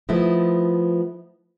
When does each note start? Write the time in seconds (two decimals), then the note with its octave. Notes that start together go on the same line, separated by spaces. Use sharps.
0.09 F3 A3 B3 E4 D#5